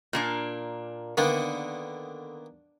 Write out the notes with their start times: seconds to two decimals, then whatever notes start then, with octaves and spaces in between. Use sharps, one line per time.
0.13 A#2 A#3 D4
1.17 D3 D#3 A#3 B3